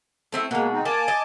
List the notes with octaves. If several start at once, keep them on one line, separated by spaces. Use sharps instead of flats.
A3 C4 E4
B2 G#3 A#3
C4 D#4
A#3 G#5 A5 D6
D#5